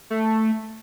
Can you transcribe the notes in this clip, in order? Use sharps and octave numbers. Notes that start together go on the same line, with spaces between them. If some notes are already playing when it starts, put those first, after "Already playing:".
A3